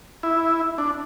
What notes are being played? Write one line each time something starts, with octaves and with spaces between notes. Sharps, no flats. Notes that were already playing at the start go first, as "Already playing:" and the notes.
E4
D4